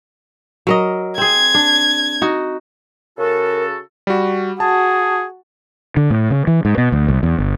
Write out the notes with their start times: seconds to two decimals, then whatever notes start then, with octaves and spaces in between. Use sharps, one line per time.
0.67 F#3 A#4 D#5
1.18 C4 G#4 G#6
1.55 D4
2.22 D#4 F#4
3.18 C#3 F#4 A4 A#4
4.07 G3 F#4
4.60 F#4 G#4 A5
5.97 D3
6.10 A2
6.30 C#3
6.47 E3
6.65 G#2
6.78 B2
6.92 D2
7.08 C2
7.23 E2
7.38 G1